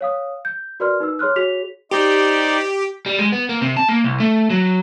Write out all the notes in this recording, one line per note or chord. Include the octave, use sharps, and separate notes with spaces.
C#5 F5 D#6
G6
F#4 A#4 B4 D5 C6 F6
D#4 B4 E6
G#4 C#5 C6 F6 F#6
F#4 G#4 C#5 B6 F7
D#4 G4 C5 D5
G3
G#3
B3
A#3
C3
A5
A#3
C2
A3
F#3